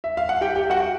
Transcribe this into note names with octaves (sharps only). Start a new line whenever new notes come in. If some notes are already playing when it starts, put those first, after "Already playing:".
E5
F5
F#5
G4 G5
G4 G5
F#4 F#5